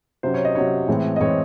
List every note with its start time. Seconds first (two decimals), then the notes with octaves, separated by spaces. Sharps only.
0.23 C3 F#3 C#4 C5
0.34 C#5
0.45 D#5
0.55 C3 F#3 C#4 C#5
0.88 A2 E3 G#3 C4
1.16 D#5
1.20 A2 E3 G#3 C4 C#5